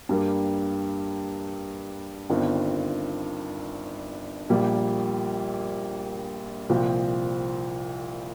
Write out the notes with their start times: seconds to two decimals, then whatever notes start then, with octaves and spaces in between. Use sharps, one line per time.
0.09 G2 G3 A#3
2.30 G1 G2 D#3 C4 F4
4.49 A#1 A#2 G3 A#3
6.69 C2 A#2 F3 C4